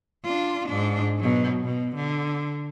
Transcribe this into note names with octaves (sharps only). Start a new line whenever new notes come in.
D4 F4
G#2 D4
B2 F#3
B2
D3